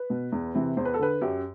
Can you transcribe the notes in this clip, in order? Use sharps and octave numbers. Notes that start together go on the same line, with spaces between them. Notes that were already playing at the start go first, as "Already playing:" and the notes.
Already playing: B4
B2
E2
C3 E3
E2 C5
B4
A4
D3 B4
F#2 G4